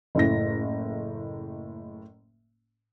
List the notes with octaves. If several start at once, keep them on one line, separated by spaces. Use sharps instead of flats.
F#1 A2 A#6